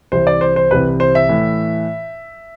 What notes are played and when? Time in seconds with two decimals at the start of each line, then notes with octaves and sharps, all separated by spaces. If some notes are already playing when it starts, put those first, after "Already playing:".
0.12 C2 C3 E3 C5
0.27 D5
0.41 C5
0.56 C5
0.71 C2 C3 E3 B4
1.00 C5
1.15 E5
1.29 A2 E3